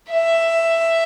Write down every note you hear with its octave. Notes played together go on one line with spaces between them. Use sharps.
E5